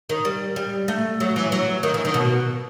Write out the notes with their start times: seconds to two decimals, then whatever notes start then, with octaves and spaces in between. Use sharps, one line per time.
0.09 D#3
0.25 G3
0.56 G3
0.88 A3
1.20 F#3
1.36 E3
1.52 F#3
1.83 D#3
1.94 E3
2.05 D#3
2.14 B2